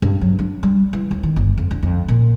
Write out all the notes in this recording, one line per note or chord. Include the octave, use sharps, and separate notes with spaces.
G2
F#3
D4
G3
E3
D#2
D#3
G1
F2
D3
F2
A#2